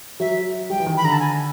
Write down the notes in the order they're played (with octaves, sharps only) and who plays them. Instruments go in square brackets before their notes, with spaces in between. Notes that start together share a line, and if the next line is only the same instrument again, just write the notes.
[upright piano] F#3 [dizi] E5
[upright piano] G3 [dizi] G5
[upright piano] E3
D#3
[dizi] B5
[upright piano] D3 [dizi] A#5
[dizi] A5
G#5